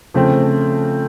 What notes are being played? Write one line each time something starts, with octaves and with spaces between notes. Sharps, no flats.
C#3 F3 A3 C4